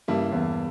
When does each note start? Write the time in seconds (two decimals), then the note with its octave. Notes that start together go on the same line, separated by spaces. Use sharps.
0.08 G2 C#3 G3 A#3 E4
0.32 E2